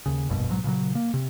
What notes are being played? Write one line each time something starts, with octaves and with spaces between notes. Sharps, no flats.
D#2 C#3
F1 A#1 G2 B2
B1 G#2 F#3
A#2 C#3 F3 F#3
A#3
C3